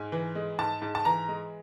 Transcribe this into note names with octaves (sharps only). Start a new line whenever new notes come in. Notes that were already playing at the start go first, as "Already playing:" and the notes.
Already playing: G#2 G#5
E3
G#3
G#2 A5
G#2
A5
E3 A#5
G#3